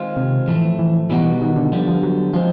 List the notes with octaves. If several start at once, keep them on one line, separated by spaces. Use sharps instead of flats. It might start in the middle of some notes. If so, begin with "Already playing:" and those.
Already playing: D#3 G#3 C4 F4
C3
A2 E3 F3 A3
E3
B2 E3 G3 B3 D#4 F#4
D#3
D3
D3 F3 G3 B3
F3
F#3
F3 G#3 C4